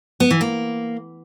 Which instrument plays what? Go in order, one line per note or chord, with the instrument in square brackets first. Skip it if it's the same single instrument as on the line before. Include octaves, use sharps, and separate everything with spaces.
[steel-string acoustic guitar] B3
E3
A#3